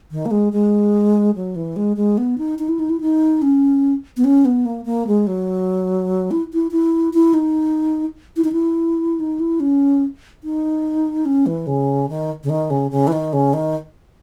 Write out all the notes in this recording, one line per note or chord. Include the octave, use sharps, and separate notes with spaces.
D#3
A#3
G#3
G#3
F#3
E3
G#3
G#3
B3
D#4
D#4
E4
D#4
E4
D#4
C#4
B3
C#4
B3
A#3
A#3
G#3
F#3
E4
E4
E4
E4
D#4
E4
D#4
E4
D#4
E4
C#4
D#4
C#4
E3
C#3
D#3
C#3
D#3
C#3
C#3
E3
D#3
C#3
D#3